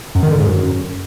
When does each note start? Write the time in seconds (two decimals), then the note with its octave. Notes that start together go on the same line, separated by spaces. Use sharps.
0.15 F#2
0.23 D#3
0.31 D3
0.39 G#2
0.46 F#2